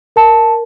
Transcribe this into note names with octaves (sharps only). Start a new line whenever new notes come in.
A#4 A5